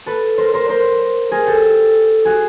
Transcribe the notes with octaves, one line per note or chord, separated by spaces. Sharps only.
A4 B4
A#4 C5
A#4 C5
A#4 C5
G#4 A#4
G4 A4
F#4 G#4